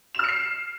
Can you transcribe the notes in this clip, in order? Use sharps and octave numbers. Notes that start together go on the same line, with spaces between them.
F6 C7 C#7 E7